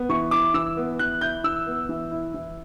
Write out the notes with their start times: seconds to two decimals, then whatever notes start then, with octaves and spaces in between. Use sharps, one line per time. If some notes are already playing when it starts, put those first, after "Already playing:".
Already playing: B3
0.09 E3 C#6
0.31 E4 D6
0.54 E3 E6
0.77 B3
0.99 E3 F#6
1.21 E4 G6
1.44 E3 E6
1.66 B3
1.89 E3
2.11 E4
2.34 E3